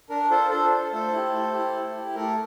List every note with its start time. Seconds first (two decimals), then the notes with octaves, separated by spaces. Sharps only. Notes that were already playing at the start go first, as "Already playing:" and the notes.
0.10 D4 A#4
0.31 F4 A4 C5
0.51 D4 A4 C5
0.72 F4 A4
0.92 A3 A4 C5
1.12 E4 G4
1.33 A3
1.53 E4 G4
1.74 A3
1.95 E4 G4
2.15 A3 A#4